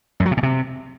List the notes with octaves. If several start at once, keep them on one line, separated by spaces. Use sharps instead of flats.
F#2
F#3
C3
A#2
C3